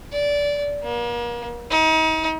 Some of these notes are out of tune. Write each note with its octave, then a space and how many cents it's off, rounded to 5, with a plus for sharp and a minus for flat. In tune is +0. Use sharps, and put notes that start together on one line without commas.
D5 -20
A#3 +40
D#4 +35